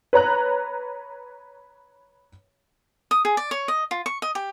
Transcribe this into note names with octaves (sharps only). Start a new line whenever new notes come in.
B4 C#5 A#5 F#6
D#6
G#4
D5
C#5
D#5
F4
C#6
D#5
G4